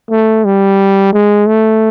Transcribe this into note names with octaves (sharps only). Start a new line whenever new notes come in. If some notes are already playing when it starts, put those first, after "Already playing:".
A3
G3
G#3
A3